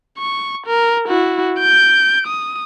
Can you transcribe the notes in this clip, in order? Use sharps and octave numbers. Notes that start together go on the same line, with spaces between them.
C#6
A#4
E4 F#4
G6 D7
D#6